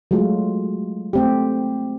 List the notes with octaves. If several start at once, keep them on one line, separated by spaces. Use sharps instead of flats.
F#3 G#3 A3 F4
A3 C4 G4